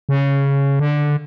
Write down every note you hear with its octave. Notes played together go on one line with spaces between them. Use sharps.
C#3
D3